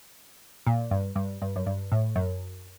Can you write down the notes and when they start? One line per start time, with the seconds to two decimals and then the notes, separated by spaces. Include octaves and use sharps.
0.67 A#2
0.91 G2
1.16 G2
1.42 G2
1.56 F#2
1.66 G2
1.92 A2
2.16 F#2